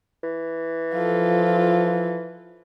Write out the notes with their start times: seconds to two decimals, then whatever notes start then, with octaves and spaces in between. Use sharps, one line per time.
0.24 E3
0.94 F3 F4 A4